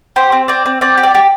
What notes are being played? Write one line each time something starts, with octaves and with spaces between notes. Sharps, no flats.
G4 C5
C4
C4 D5
C4
C4 D5
G4
D5
G4